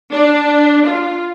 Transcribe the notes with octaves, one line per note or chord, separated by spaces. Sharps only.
D4
F4